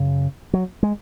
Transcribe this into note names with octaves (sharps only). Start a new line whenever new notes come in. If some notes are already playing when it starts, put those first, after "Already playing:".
Already playing: F#2 C#3
F#3
G#3